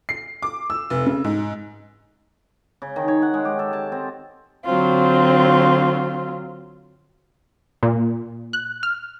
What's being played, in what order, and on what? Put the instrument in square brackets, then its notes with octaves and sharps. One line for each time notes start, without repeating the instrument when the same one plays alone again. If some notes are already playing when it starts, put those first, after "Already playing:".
[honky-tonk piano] C7
D6
E6
F1
C#3
G#2
[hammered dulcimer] C#3
D#3
C#5
F#5
G#3
G4
A4
A5
C4
[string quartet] D3 F#3 C4 F4
[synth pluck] A#2
F#6
F6